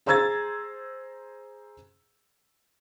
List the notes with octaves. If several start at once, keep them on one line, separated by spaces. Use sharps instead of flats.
G#4 C5 A#5 E6 G#6 A6